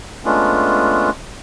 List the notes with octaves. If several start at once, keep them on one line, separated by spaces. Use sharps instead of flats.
G#3 A3 B3 C#4 D4 F4